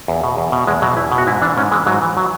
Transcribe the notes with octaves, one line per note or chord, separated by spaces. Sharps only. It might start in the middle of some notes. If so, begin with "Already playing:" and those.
E2
B2
E2
B2
E2 G#3
B2 F#3
E2 E4
B2
F#4
G#2 E4
E3 D4
G#2 C#4
E3 G#3
G#2 F#3
E3
F#3